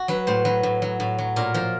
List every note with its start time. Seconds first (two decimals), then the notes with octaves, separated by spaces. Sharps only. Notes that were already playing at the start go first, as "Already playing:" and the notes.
Already playing: F#4
0.08 F#3 B4
0.27 A2 C5
0.45 F#3 B4
0.63 A2
0.82 F#3
1.00 A2
1.18 F#3
1.36 A#2 A#4
1.54 F3 A#4